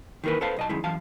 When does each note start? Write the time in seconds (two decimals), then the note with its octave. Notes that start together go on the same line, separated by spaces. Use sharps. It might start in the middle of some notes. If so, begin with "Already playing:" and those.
0.24 D#3 E3 A#3 A#4 B4
0.41 A4 B4 C5 F5 A5
0.56 B1 D#5 A5
0.69 F#2 D#3 G#3 E4
0.84 F#2 E3 F5 A5